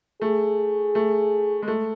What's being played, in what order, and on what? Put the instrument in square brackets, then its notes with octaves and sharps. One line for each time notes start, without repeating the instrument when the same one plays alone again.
[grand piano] A3 [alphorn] G#4
[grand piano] A3
G#3
A3